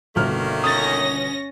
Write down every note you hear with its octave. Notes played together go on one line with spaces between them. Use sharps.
G1 B2 D#3 A3 A#3 F6
C#4 D#6 A6 A#6